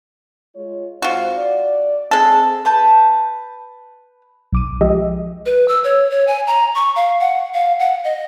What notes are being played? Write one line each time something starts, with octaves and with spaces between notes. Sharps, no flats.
G#3 F4 C#5
G#2 C4 F4 F#4
D5
G#3 C4 G#4 A4
B4 A5 G6
B1 D6 D#7
F3 G#3 G4 D#5 E5
B4
E6
C#5
C#5
G#5
A#5
C#6
F5
F#5
F5
F#5
D#5